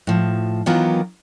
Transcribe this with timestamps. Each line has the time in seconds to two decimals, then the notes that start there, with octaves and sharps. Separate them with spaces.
0.07 A2 F3
0.66 D#3 E3 F#3 B3 F4 A#4